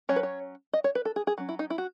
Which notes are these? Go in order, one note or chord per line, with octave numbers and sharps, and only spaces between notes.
F#3 C#4 C#5
B4
C#5
D#5
C#5
B4
A4
G#4
G#4
F#3 C#4
E4
D#4
E4
F#4